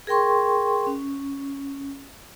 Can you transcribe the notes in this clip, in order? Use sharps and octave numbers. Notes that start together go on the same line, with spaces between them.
G#4 A#4 G5 C6 C#6
C#4